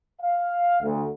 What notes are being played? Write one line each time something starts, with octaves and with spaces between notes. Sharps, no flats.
F5
D2